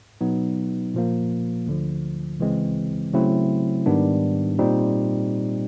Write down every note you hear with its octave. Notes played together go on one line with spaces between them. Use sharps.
B2 F#3 B3 D#4
A#2 F3 A#3
D2 D3 F3
C#2 C#3 E3 G#3 C4
C#3 F#3 A3 C4 E4
G#2 D#3 G3 B3 D4
A#2 G3 C4 D#4